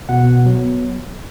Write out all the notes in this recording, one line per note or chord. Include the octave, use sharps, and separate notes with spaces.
B2 F#5
F#3 B3